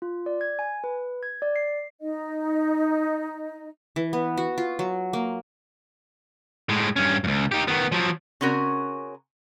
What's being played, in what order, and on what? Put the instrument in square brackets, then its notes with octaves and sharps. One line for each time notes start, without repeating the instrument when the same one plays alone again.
[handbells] F4
D5
G#6
G#5
B4
G#6
D5
C7
[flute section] D#4 D#5
[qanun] E3
B3
F#4
F4
F#3
A#3
[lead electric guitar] A2 G#3
G2 C#4
C#2 F#2
D#4 G4
D#3 B3
F3 F#3
[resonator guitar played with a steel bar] C#3 C4 C#4 F#4 A#4